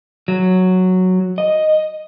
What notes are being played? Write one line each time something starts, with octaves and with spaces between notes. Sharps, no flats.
F#3
D#5